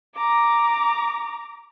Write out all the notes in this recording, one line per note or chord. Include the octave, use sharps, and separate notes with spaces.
A#5 D6